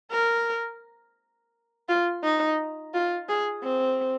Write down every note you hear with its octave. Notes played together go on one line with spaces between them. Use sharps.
A#4
F4
D#4
F4
G#4
C4